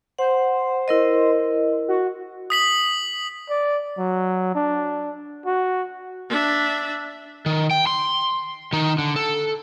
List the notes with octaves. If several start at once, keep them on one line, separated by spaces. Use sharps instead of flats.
C5 F#5
E4 A#4 D#5
F#4
D#6 B6 F#7
D5
F#3
D4
F#4
D4 E5
D#3
G5
C6
D#3 D#4
D3
A4